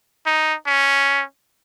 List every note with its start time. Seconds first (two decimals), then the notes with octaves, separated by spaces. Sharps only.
0.26 D#4
0.67 C#4